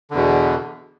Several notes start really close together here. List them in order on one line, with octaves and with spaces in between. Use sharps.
D3 E2 B2